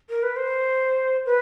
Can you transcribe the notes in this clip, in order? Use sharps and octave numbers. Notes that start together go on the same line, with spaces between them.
A#4
B4
C5
B4